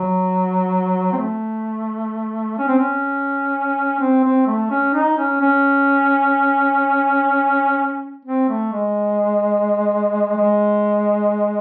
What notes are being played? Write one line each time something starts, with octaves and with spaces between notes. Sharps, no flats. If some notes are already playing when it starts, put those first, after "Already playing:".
Already playing: F#3
C4
A3
C#4
C4
C#4
C4
C4
A3
C#4
D#4
C#4
C#4
C4
A3
G#3
G#3